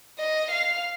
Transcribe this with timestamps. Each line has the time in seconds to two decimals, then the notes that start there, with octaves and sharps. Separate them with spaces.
0.19 D#5
0.51 F5